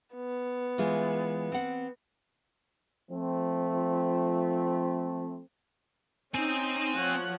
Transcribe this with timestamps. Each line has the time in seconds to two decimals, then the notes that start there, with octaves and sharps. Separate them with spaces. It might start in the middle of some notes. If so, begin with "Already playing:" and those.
0.15 B3
0.78 E3 G#3 F4
1.52 C4 F#5
3.11 F3 A3 C4
6.35 C4 C#4 D#4 G#5
6.96 F3 C#5 F#5